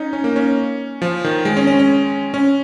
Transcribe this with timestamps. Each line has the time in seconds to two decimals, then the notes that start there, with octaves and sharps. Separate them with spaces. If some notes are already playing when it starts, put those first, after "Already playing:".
Already playing: C#4 D#4
0.13 C#4
0.24 A#3
0.36 C#4
1.02 F3
1.24 D#3
1.45 G#3
1.57 C#4
1.67 C#4
1.79 C#4
2.34 C#4